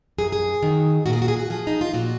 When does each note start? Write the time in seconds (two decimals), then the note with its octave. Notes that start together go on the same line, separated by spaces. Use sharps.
0.18 F#2 G#4
0.32 G#4
0.63 D#3 F#3
1.06 A#2 F#4
1.13 G#4
1.22 F#4
1.28 G#4
1.37 F#4
1.50 F3 G#4
1.67 D#4
1.81 F4
1.94 A#2 F#4